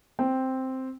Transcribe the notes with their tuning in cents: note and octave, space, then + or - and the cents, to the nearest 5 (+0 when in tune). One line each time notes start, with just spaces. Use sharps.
C4 +0 G5 +0